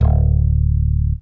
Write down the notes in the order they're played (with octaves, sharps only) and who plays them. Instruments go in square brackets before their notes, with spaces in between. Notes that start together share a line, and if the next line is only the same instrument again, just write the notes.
[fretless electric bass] D1